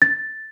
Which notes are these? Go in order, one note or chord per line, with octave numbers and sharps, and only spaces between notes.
A6